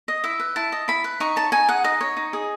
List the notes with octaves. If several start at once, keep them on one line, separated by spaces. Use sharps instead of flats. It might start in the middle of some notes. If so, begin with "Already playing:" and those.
D#5
E4 E5
B4
E4 A5
D#5
E4 B5
B4
D#4 C#6
C#5 A5
D#4 G#5
G#4 F#5
D#4 D#5
C#5
D#4
G#4